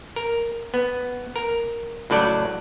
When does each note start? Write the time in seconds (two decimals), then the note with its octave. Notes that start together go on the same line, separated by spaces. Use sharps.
0.16 A#4
0.74 B3
1.36 A#4
2.10 C#2 A2 F#3 D5